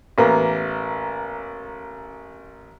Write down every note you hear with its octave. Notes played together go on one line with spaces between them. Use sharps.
A1 A#3 B3